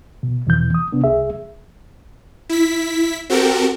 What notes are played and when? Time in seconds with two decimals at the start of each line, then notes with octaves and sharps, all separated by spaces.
0.23 B2
0.47 E2 B2 E3 G6
0.74 D#6
0.92 C3 B3 D4
1.04 C2 G#4 E5
2.49 E4 B6
3.30 C4 F#4 G4 A4 A#4